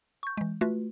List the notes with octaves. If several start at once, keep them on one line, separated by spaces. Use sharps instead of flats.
C#6 G6
E3 G#3
A3 F4 F#4 B4